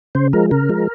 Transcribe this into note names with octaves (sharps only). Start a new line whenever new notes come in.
C#3 C5
F3 G#3 A#4
C#3 A#4
F3 G#3